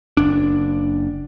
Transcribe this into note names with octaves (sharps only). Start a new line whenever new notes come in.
F#1 D4